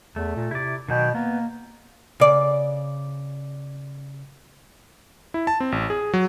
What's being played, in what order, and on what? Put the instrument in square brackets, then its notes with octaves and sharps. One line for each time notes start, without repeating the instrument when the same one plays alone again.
[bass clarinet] E2 [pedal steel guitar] A3
[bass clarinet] A#2
[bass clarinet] C3 [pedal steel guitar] E4 D5
[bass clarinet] B2 [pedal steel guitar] D#3 F#3 G5
[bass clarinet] A#3 [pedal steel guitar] B3
[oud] C#3 D5
[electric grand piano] E4
A5
C4
A1
G#4
F#3